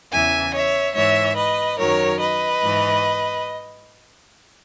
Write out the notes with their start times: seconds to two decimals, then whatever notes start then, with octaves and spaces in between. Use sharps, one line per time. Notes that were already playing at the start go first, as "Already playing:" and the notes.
0.11 E2 C#3 E3 E5 G#5
0.53 C#5 E5
0.94 G#2 E3 C#5 E5
1.36 B4 D#5
1.78 F#2 D#3 F#3 A#4 C#5
2.19 B4 D#5
2.61 G#2 E3